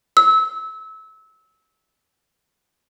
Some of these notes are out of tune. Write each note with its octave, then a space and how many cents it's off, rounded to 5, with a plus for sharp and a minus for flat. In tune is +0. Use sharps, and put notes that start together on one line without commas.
E6 -25